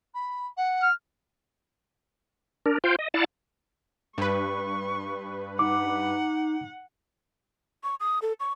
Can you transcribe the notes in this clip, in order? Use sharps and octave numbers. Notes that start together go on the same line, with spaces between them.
B5
F#5
F6
D4 A#4
F4 C5 F5 G5
D#5
E4 D5 F5 F#5 A5
G2 B4 C#6
D#4 F#5 D6
C#6
D#6
A4
C#6